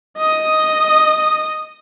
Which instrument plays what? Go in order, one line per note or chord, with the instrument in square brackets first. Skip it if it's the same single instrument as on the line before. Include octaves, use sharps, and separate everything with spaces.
[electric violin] D#5 D#6